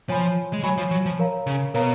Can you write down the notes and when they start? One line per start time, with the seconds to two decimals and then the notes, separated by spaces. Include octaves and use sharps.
0.09 F3 C#5 G#5 B5
0.53 G#3
0.63 F#3 C#5 G#5 B5
0.78 F3
0.91 F#3
1.06 F3
1.19 A#4 C#5 F5 A#5
1.47 C#3
1.74 B2 A#4 C#5 F5 A#5